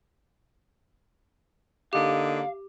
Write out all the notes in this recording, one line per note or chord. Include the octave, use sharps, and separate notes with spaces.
D3 A#3 D#4 G4 F5